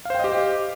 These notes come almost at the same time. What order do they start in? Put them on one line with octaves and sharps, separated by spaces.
F5 C5 G5 D#5 G4